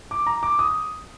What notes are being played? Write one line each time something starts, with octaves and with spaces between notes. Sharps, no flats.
D6
A#5
D6
D#6